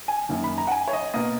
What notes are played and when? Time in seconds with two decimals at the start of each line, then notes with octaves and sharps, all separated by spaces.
0.08 G#5
0.29 F#2 D#3 A#3
0.44 B5
0.58 A#5
0.67 F#5
0.71 G#5
0.88 C#5
0.93 D#5
1.14 B2 A#3 D#5